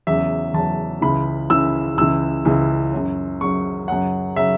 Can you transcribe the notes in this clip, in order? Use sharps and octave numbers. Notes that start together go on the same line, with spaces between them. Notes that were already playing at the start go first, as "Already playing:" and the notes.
E2 C#3 F#3 E5
E2 C#3 F#3 A5
C#2 C#3 E3 B5
C#2 C#3 E3 E6
C#2 C#3 E3 E6
C#2 C#3 E3
F#2 C#3 F#3
F#2 C#3 F#3 C#6
F#2 C#3 F#3 F#5
C#3 F#3 E5